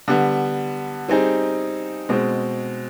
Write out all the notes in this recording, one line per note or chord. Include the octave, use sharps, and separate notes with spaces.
D3 G3 B3
G3 C4 D#4 G#4
B2 G#3 C4